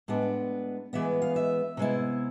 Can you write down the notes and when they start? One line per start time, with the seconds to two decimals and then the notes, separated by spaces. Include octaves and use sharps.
0.08 A2 G#3 B3 D4
0.93 E3 G#3 B3 E5
1.22 F5
1.36 E5
1.77 C3 G#3 B3 E4